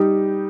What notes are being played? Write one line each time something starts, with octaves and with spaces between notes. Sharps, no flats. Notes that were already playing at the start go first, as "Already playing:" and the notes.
Already playing: G3 D#4 G4